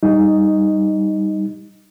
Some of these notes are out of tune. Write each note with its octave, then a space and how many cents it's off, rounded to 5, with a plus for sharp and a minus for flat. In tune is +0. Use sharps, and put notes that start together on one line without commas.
G3 +0 D#4 +0 D#5 +0